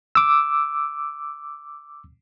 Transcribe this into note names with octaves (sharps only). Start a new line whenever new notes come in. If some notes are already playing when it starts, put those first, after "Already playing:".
D6 E6